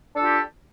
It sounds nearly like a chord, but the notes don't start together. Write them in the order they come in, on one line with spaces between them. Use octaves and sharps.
D4 A4 F4 G4